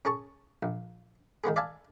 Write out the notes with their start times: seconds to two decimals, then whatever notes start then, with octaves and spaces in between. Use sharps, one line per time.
0.05 C#4 G#4 A5 C#6
0.63 A#1
1.44 D#3 G#3 B3 G#4
1.56 D5 E5 F5 G#5 A5